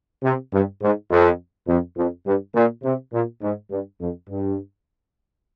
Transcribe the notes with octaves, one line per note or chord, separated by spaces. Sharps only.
C3
G2
G#2
F2
F2
F2
G2
A#2
C3
A#2
G#2
G2
F2
G2